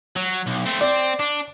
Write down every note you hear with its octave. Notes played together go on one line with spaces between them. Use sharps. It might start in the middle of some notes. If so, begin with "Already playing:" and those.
F#3
B1
A3 C4
C4 D5
D4